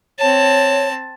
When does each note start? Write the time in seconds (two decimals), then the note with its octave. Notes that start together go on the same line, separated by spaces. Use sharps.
0.19 C4 C#5 A5